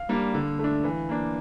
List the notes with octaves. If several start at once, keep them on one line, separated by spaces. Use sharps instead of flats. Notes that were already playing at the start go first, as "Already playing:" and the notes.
Already playing: F5
G3 A#3 D4
D3
A3 D4
E3
A#3 D4